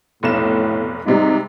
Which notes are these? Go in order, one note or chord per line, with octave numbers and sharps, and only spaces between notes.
F1 B1 A2 E7
G#2 C3 G3 D#4